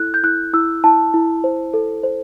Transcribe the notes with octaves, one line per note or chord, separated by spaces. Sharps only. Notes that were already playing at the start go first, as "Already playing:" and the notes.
Already playing: E4 A4 F#6
G6
E4 F#6
E4 E6
E4 A5
E4
C5
A4
C5